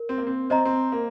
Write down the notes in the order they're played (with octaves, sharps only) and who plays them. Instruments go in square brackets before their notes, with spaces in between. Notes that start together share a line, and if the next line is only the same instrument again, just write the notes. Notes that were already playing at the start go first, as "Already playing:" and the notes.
Already playing: [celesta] A#4
[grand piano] C4
A#3
C4
[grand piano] C4 [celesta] C5 D#5 A#5
[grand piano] C4
A#3